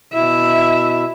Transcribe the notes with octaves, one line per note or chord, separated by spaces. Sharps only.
B2 E4 E5